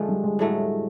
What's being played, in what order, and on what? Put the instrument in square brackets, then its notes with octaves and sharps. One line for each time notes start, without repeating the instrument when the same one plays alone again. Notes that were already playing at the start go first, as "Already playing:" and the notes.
Already playing: [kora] D3 F3 A3 [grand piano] G#3
[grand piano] G3
G#3
[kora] A2 F#3 A3